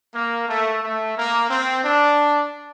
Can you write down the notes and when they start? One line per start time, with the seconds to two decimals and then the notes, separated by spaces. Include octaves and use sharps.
0.14 A#3
0.48 A3
0.82 A3
1.16 A#3
1.50 C4
1.85 D4